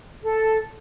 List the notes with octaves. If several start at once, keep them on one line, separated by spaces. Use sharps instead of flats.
A4